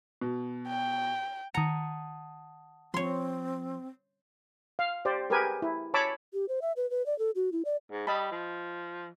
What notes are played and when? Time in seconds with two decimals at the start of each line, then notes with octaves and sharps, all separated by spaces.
0.21 B2
0.68 G5
1.54 D#3 F#5 A5 A#5 D#6 C#7
2.94 F3 C4 C#5 C6
4.79 F5
5.05 G4 C5 D5
5.30 G4 G#4 A#4 B4 G#5
5.62 E4
5.94 C#5 A5 B5 D6 E6
6.33 G4
6.49 C5
6.62 E5
6.76 B4
6.90 B4
7.06 D5
7.19 A4
7.35 F#4
7.52 E4
7.65 D5
7.91 G#2
8.07 G3 D#5 A5 B5
8.32 F3